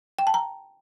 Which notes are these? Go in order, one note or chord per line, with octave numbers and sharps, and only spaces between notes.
G5
A5
A#5